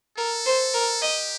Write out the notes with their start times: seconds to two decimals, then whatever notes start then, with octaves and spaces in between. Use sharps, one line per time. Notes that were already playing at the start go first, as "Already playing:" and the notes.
0.18 A4 A#4
0.46 C5
0.74 A#4
1.02 G4 D#5